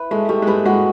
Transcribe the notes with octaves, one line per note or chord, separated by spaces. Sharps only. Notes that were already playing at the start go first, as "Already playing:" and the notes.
Already playing: E4 B4
G#3 A3
G3 A3
G#3
G3 B4
G#3 F#4